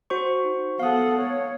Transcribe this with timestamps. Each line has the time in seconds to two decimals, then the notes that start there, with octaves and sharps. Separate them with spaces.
0.10 F#4 C5 C#6
0.43 D#4
0.79 B3 A4 F5 F#5 D#6
1.19 C#5